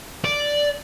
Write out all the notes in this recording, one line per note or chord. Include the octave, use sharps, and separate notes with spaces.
D5